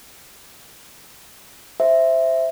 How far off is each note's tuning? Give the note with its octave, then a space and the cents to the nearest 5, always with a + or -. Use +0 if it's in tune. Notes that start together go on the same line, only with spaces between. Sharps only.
C5 +0 E5 +0